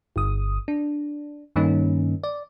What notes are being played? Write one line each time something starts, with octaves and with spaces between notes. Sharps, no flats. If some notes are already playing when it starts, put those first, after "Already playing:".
G1 D#6
D4
G2 D#3 A#3 C#4 D#4
D5